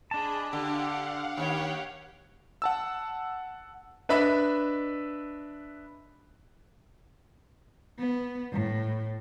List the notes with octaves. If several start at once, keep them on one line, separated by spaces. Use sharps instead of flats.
D4 G#4 D#5 A5 B5
D3 G4 F5 F#5
D#2 G4 C#5 G5
F#5 A5 E6
D4 B4 D#5 E5 B5
B3
A2